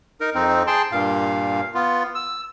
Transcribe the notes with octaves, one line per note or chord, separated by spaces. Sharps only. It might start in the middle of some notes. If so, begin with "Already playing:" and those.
D#4 A#4
F2 C4 D#4
G#4 G5 A5 C6
G2 A#2 F5
B3 F4
E6